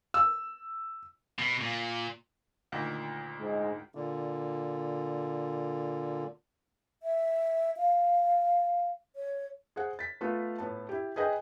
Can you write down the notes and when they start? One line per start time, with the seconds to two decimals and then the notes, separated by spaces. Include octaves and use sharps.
0.14 E6
1.39 B2
1.61 A#2
2.72 D2 A#2 D#3
3.40 G#2
3.95 A#2 D3
7.03 E5
7.77 F5
9.16 C#5
9.76 G#4 C5 F#5
9.99 A6 B6
10.21 A3 B3 F4
10.58 A2 B3 A5
10.89 E4 G4
11.16 G#4 B4 D#5 G5 G#5